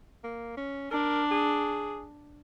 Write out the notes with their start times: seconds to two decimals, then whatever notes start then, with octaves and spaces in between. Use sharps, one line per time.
0.24 A#3
0.57 C#4
0.91 D4 A#4
1.31 G#4